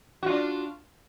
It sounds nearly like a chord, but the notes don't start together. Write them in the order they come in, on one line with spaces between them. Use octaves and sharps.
F#4 F4 D4